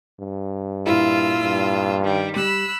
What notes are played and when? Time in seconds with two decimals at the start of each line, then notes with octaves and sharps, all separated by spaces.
0.20 G2
0.87 A#2 E4 F4 E6
1.41 G2
2.02 D#3 G3
2.36 G3 B5 E6 F#6